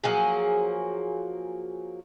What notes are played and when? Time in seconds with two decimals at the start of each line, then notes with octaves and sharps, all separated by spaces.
0.04 F3 F#3 A#3 G#4